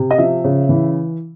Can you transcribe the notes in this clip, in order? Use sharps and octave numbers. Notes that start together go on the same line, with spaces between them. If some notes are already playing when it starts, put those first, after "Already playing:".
Already playing: C3
D#5
F3 E5
C#3
E3